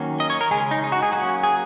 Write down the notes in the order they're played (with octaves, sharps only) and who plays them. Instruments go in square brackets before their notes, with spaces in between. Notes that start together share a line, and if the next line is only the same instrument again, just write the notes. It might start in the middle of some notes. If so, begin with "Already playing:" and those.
Already playing: [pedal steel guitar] D#3 F#3 A#3 C#4
D#5
C#5
A#4
C#3 G#3 C#4 G#4
D#4
D#4
F#4
G#4
F#3 A#3 C#4 F#4
G#4